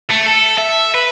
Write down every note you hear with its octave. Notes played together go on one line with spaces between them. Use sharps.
A3
A4
E5
B4